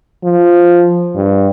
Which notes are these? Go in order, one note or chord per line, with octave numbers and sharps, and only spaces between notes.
F3
G2